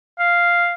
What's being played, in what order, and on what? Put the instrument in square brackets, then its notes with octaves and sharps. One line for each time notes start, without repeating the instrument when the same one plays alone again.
[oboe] F5